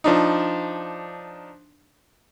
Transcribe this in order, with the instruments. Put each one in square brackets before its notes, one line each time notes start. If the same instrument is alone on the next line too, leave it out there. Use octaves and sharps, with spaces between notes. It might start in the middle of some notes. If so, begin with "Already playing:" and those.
[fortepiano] F3 D4 D#4